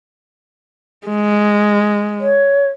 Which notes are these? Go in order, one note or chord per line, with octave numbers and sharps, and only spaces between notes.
G#3
C#5